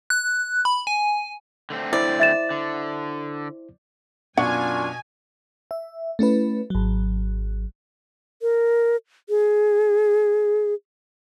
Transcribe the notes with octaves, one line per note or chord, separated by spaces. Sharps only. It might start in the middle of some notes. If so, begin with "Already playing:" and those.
F#6
B5
G#5
D3 A3 C4
E4 C5 D5
E5 A6 E7
D3
F#2 B2 D4 F4 F#5 G#5 C#6
E5
A3 C#4 E4 B4
G#1 F#3
A#4
G#4